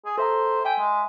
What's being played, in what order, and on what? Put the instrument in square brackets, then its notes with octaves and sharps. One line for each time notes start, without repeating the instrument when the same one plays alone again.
[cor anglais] G#4
[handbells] A4 E5 A#5 [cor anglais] C5
[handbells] E5 G#5 [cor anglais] G5
[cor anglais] G#3